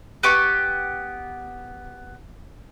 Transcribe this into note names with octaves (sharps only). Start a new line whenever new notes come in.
B3 G4 C#6